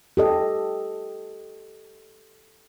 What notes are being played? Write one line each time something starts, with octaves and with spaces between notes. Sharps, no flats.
G4 A4 D#5